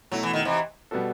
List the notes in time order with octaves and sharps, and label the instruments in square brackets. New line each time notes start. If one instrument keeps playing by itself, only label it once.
[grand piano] B2 A3 E4 [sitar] F#3
[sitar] E3
D#3
C3 E3
[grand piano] B2 G3 B3 F#4 A4